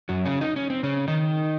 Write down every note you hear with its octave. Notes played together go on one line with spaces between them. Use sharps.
F#2 F#3
C#3 C#4
D#4
C#4
C4
C#3 C#4
D#3 D#4